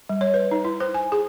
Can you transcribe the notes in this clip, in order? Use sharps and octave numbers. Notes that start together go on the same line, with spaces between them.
G3
C#5
B4
D#4
E4
C5
G#5
G#4